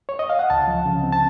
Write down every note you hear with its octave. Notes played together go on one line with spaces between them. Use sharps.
C#5
D#5
F5
F#5
C#2 A5
F3
C#3
C4
A5